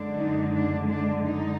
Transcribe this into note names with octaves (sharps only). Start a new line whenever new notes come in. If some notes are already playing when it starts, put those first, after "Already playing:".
Already playing: F#2 D3 G#3 D4
D#4
D4
D4
D#4